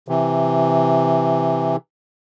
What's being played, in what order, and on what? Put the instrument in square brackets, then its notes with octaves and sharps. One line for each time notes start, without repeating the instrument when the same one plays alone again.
[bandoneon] C3 E3